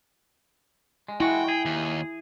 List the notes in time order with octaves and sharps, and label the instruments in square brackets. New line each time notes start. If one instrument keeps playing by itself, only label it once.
[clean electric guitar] G#3
[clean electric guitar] G#3 F#4 [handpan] E4 [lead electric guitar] G5
[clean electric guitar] G#4
[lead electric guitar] D#2